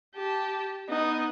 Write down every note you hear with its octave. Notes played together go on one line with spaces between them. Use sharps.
G4 A5
B3 D#4